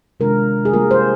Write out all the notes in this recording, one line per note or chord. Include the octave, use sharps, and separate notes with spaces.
C3 D#3 G#3 D4 F4 A#4
G#4
G3 A#3 F4 A#4
C5